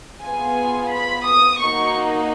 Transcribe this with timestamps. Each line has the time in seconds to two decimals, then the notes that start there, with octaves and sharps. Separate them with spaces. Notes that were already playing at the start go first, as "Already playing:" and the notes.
0.22 B3 F4 G#4 G#5
0.92 B5
1.26 D#6
1.61 A#3 D#4 F#4 C#6